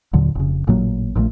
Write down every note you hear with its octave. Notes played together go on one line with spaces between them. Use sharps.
D#2 A#2 D3 F#3
F1 C#3
A1 A#2 F#3 A#3
A#1 A#2 E3 A3